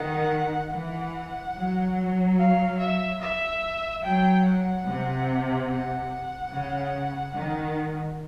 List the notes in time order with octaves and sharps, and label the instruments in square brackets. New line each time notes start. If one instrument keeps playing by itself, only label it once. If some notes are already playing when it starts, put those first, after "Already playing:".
Already playing: [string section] D#3 [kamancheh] F#5
[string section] E3 [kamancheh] F#5
[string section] F#3
[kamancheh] F5
E5
E5
[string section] F#3 [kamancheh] G5
[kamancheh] F#5
[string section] C3
[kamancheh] F#5
[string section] C#3
D#3